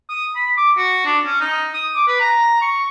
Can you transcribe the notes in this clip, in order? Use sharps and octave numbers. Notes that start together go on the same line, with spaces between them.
D#6
B5
D6
F#4
D4
C#4
D#4
D#6
D6
B4
A#5
C#6